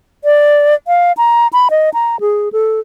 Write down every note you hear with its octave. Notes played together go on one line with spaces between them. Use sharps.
D5
F5
A#5
B5
D#5
A#5
G#4
A4